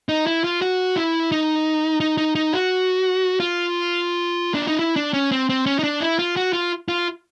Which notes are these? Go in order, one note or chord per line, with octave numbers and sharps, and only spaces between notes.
D#4
E4
F4
F#4
E4
D#4
D#4
D#4
D#4
F#4
F4
D4
D#4
E4
D4
C#4
C4
C4
C#4
D#4
D4
E4
F4
F#4
F4
F4